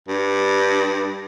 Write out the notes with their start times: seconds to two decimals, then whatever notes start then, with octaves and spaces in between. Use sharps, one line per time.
0.08 G2